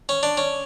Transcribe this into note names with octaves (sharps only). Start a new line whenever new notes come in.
C#4
D4
C#4